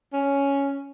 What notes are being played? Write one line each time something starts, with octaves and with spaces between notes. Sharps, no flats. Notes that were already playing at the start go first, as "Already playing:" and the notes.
C#4